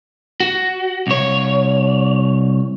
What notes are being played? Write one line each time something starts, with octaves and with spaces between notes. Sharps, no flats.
F#4
C2 C#5